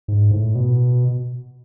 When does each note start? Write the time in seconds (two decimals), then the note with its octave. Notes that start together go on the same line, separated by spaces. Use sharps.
0.08 G#2
0.31 A2
0.55 B2